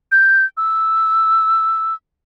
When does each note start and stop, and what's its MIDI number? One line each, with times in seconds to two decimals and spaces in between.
0.12 0.45 91
0.57 1.94 88